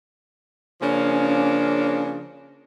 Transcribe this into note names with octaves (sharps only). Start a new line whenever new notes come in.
C#3 F3 A#3 C#4 D4